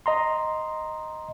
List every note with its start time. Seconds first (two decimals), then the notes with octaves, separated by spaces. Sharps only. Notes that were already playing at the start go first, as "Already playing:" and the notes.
0.06 D#5 A#5 C6